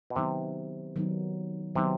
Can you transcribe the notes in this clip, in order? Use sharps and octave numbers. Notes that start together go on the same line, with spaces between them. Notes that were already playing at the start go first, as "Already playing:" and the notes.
B2
C3 D#3 F#3 B3 D#4
D#3 F#3 B3 D#4
C3 D#3 F#3 B3 D#4